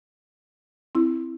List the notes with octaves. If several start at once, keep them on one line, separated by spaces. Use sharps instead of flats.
C4 E4